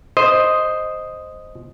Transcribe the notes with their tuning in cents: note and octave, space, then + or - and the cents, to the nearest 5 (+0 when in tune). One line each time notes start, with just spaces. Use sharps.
C5 +0 D#5 +0